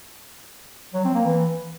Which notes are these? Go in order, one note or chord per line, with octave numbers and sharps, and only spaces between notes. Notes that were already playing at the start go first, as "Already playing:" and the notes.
F#3
C4
A#3
E3